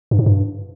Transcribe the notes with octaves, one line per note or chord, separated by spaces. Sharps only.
G2
G#2
G2